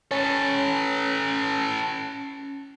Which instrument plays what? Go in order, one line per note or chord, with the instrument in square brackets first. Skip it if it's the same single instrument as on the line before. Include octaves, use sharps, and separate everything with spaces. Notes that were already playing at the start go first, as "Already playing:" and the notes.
[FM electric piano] C#4 [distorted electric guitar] A4 B4